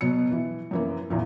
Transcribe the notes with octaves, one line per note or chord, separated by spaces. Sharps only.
B2 F#3 B3 C#7
E3
F#2 E3 A#3
E2 A#2 E3